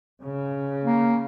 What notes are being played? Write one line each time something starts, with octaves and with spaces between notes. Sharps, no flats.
C#3
A#3